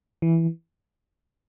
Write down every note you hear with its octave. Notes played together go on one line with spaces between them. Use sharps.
E3